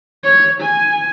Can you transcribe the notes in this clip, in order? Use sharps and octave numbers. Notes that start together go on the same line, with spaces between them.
C#5
G#5